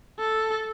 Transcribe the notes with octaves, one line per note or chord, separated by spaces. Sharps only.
A4